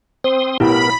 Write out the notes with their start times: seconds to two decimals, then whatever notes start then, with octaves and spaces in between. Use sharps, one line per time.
0.24 C4 C5 C6 D#6
0.60 B1 A2 B3 E4 G4 A#4 B5